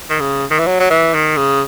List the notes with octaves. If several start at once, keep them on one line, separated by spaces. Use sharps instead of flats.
D#3
C#3
D#3
E3
F#3
F#3
E3
D#3
C#3